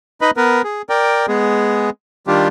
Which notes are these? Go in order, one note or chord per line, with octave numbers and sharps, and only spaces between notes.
D#4 B4 D#5 B5
B3 A#4 B4
G#4
A#4 D5 G5
G#3 B3 G#4
D#3 G3 D4 F4 G4